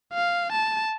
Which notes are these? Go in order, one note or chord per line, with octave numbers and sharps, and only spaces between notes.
F5
A5